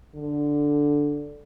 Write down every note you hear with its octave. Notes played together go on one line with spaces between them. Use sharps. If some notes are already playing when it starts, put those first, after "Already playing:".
D3